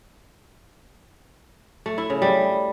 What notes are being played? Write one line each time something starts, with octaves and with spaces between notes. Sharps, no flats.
A3
E4
C#3
G3